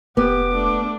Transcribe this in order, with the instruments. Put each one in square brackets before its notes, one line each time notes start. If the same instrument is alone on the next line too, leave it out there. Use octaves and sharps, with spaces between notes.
[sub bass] F1 [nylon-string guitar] B3 [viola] G4 [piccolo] D6
[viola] A3 D4